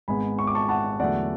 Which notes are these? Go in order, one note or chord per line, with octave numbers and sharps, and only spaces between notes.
G#1 G#2 G#3 B3 G#5 B5
C#6
D6
A5 C#6
F#5 A5
E2 D3 F#3 A3 D5 F#5